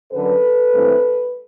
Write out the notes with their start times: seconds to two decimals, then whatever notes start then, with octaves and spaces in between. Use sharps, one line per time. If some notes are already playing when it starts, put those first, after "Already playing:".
0.13 F#2 D3 F#3 A4 B4
0.73 G2 E3 A3 C4